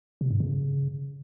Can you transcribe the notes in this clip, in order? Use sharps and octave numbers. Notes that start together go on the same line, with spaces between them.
C3
G2
C#3